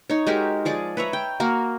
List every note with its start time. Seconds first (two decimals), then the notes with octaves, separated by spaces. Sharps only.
0.10 D#4 C#5
0.27 G#3 F#4 G4 A#4
0.65 F3 G#4 D5
0.97 B4 C#5 E5 A#5
1.13 G5
1.40 A#3 F#4 A#4